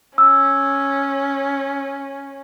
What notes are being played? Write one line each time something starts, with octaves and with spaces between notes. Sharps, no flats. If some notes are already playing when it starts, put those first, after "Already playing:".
C#4 E6